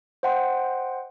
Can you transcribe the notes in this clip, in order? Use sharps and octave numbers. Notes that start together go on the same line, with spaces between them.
C5 D#5 F#5 G5 C6